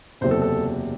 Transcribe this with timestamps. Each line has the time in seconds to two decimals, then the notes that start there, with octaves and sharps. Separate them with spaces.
0.21 F#1 E2 C3 F#3 C5
0.31 A4
0.42 A4